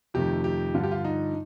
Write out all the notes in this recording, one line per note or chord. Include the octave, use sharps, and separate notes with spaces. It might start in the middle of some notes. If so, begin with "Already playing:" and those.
F2 C3 D#3 A3 G4
G4
G2 D3 F3 F4
G4
F4
D#4